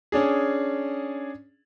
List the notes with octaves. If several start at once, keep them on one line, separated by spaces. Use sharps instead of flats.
C#4 D4 G#4